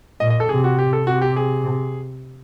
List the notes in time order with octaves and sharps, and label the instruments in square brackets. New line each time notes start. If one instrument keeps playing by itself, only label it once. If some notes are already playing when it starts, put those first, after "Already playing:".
[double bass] A#2 [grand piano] D#5
[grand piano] D#5
A4
[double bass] C3 [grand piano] G#4
[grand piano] F#4
G4
A4
[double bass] C3 [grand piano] F#4
[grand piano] G4
G#4